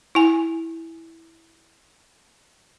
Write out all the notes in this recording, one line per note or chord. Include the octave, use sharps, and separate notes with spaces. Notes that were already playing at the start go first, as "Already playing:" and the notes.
E4 G#5